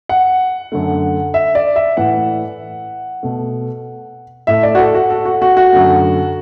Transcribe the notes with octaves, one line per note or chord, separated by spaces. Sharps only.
F#5
F#2 D3 A3
E5
D5
E5
A2 E3 A3 F#5
B2 A3
A2 A3 E5
D5
F#4
A4
F#4
A4
F#4
F#4
F#4
F#2 D3 A3